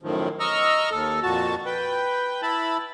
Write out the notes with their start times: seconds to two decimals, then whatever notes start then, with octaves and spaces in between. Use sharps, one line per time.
0.03 F#2 A2 D#3 F3
0.40 D#5 A#5 C#6 E6 F6
0.91 D#2 A4
1.23 F2 A#2 F#4 A5
1.66 B4 G5
2.42 E4 A5 B5